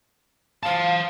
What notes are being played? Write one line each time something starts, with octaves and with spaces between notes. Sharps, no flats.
C5 F5 A5